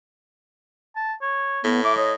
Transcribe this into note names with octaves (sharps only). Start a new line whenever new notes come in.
A5
C#5
A2 B3
E5 D6
C#5 D#5